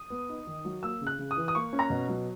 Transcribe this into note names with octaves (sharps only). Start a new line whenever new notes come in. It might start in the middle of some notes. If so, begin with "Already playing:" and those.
Already playing: D#6
B3
D#4
D#3
F#3
A#3 E6
C#3
F#6
C#3
D#6
E3
D#6
A#3 C#6
C#4
A#5
B2
F#3